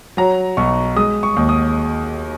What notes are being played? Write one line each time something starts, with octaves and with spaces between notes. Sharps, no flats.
F#3 A#5
B1 C#6
G#3 D#6
C#6
D#2
D#6